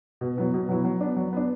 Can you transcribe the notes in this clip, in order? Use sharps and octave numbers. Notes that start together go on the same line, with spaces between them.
B2
F#3 B3 E4
B2
F#3 B3 E4
F#3
B3 D4
F#3
B3 D4